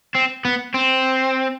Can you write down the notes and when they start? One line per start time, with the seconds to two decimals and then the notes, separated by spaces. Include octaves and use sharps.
0.15 C4
0.45 B3
0.75 C4